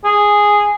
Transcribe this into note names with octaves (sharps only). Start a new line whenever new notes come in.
G#4